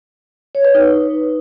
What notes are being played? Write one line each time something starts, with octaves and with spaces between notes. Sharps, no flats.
C#5
B4
D#4